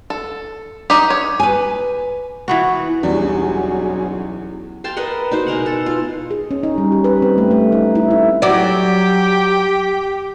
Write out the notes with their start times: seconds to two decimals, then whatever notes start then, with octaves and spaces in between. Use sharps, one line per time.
0.10 A4
0.90 D#4 G4
1.10 C#5
1.40 B4 G#5
2.48 E3 B3 F#4
3.03 B1 E2 F#3 G3 C#4 D4 G#4
4.84 F5 G5 A5 C6
4.97 A#4 B4 D#5 F#5
5.31 D#4 F#4 C5
5.47 B2 G#3 A#4 F#5
5.66 A4
5.86 F4
6.31 G#4
6.51 C#4
6.63 D#4
6.78 G3
6.92 G4
7.04 B4
7.22 C4
7.38 A3
7.51 A3
7.72 D#4
7.95 E4
8.11 E4
8.42 F#3 G4 D5